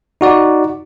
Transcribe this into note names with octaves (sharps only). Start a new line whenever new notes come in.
D#4 F#4 D5